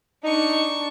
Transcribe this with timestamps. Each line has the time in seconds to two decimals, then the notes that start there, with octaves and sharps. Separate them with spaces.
0.24 D4 D#4 C#6